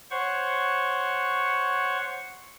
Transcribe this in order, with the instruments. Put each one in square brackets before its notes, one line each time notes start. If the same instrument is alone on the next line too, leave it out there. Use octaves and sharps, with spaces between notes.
[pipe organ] C5 C#5 F#5 C#6